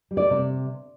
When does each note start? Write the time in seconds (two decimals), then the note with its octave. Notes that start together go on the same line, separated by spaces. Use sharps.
0.11 G3
0.17 D5
0.30 C3